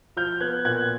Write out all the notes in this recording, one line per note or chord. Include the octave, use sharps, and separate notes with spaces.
F3 F6 G6
B3 F#6 G#6
A#2 F#6 G#6